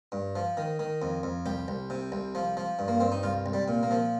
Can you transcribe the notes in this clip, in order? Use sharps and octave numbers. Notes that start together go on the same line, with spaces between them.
G2
F3
D#3
D#3
F2
F2
C2 G4
C2
C3
C2
F3
F3
G2
A#3
G2 C4
D#4
C2 F4
C2
G3
A#2
A#3
F3